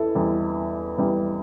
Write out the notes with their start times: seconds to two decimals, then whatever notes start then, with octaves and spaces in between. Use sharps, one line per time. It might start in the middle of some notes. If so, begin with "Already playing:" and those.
Already playing: E2 E3 E4 A4
0.15 E2 E3 G3
0.98 E2 E3 G3